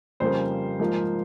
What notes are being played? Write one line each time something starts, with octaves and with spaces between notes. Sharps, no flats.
F2 C#3 G3 A#3 C5
G#2 F3 A#3